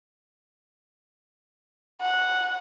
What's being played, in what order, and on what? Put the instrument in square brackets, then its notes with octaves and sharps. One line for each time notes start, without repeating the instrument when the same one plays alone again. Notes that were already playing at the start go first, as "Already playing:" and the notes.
[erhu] F#5